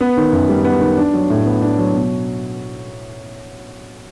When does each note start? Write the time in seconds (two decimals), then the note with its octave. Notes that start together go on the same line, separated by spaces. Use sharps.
0.01 B3
0.17 D#3
0.33 F#2
0.49 G3
0.64 B3
0.81 D#3
0.97 D4
1.14 F#3
1.30 A2
1.46 B3
1.62 D4
1.79 F#3
1.94 B2